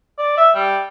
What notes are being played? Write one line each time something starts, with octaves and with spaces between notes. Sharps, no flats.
D5
E5
G3